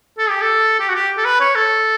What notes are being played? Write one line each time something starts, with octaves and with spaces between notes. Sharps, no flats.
A4
G4
A4
G4
F#4
G4
A4
B4
C#5
A4